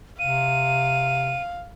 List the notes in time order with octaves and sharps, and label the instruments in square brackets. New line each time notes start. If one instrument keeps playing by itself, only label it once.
[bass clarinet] C3 [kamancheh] F5 [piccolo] D#7